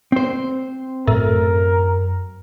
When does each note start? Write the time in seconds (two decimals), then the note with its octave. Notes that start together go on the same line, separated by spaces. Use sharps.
0.12 C4 C5
1.08 F#2 A2 A#4